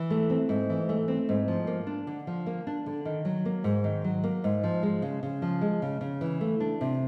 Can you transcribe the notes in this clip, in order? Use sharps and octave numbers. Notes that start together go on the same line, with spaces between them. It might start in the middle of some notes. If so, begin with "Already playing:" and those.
Already playing: E3
A3
C4
G#2
E3
A3
C4
G#2
F3
A#3
D4
D3
F3
A#3
D4
D3
D#3
F#3
A#3
G#2
D#3
F#3
A#3
G#2
F3
G#3
C#3
C#3
F3
G#3
C#3
C#3
E3
A3
D4
C3